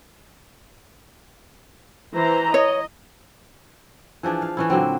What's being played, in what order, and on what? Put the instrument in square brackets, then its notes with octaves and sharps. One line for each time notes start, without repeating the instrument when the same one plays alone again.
[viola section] E3 C5 A#5
[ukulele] C#5 [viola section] D#5
[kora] E3 F3 D4 G#4
F5
E3 C#4 E4
A#2 D3 F#3 C4